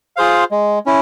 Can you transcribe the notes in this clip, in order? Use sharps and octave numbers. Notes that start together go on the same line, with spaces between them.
F4 G#4 C5 F5
G#3
C#4 E4